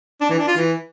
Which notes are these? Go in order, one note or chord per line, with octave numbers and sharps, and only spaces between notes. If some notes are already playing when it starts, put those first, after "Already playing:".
D4
E3
D4
F4
E3